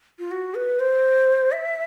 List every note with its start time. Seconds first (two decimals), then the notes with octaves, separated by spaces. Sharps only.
0.19 F4
0.31 F#4
0.55 B4
0.80 C5
1.52 E5